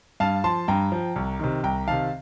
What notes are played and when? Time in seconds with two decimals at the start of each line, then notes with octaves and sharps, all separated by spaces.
0.20 G2 F5 A5
0.44 F3 A5 C6
0.68 G2 G5 A#5
0.92 F3
1.16 C2
1.40 C3 D#3
1.63 C2 G5 A#5
1.87 C3 D#3 F5 A5